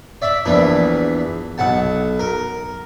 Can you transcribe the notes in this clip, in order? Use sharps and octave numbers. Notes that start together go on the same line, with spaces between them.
D5 E5
A#1 E2 E3 D4
B1 F#5 A5
A#4